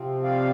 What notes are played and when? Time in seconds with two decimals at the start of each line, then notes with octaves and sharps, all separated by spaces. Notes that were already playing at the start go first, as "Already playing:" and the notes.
Already playing: C3 F3 C4
0.23 D5 F5